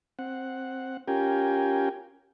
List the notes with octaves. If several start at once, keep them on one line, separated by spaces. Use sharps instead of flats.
C4 F#5
C#4 F4 G4 A#4 G5 G#5